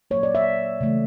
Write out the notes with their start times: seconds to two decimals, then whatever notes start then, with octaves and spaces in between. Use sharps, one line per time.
0.11 A#2 F#3 A#3 C#5
0.23 D5
0.35 E5
0.81 C#3 E3 A3